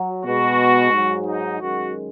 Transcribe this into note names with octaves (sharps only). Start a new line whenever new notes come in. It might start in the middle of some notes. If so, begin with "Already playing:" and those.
Already playing: F#3
B2 G#3 F#4
G#2 F#3
D#4
F#2 D#3 G#3 F#4